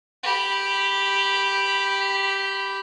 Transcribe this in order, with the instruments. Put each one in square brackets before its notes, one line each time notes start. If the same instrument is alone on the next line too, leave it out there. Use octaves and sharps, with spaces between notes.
[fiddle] G4 B5